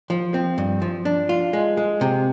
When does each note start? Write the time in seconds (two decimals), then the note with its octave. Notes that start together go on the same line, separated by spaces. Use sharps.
0.10 F3
0.34 C4
0.58 G2
0.82 F3
1.05 D4
1.29 F4
1.53 G#3
1.77 G#3
2.01 C3